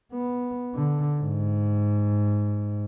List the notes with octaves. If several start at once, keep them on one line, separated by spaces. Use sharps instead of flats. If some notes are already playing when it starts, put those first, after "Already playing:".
B3
D3
G#2